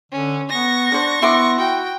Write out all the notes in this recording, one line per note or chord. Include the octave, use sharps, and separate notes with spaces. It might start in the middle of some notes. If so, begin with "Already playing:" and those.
D3 C#4
B3 C#6 A#6
D4 C5 F#5
B3 E4 C6 D6
F#4 G5